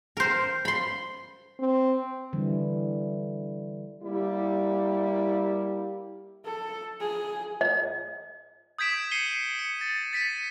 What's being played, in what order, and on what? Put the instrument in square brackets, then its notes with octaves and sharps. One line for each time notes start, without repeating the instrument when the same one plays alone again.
[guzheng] A#4 C5
B5 C6
[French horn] C4
[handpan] D3 E3 G3
[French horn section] G3 A#3 E4 G4
[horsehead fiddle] A4
G#4
[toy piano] D#5
[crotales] D#6 G6 G#6 B6 D7 E7
C7 C#7 D#7 G7
C#7
A6
A6 B6 C#7 D#7